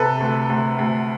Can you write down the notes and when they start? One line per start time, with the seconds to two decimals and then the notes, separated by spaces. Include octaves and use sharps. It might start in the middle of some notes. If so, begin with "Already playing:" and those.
Already playing: C3 A4 B4
0.20 D2
0.49 D2
0.78 D2